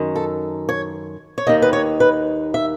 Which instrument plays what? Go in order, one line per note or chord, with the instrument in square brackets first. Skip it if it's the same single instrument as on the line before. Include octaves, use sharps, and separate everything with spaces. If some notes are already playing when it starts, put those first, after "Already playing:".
Already playing: [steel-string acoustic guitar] F#2 D#3
A4
C#5
C#5
D#2 D#3 D#5
B4
C#5
B4
E5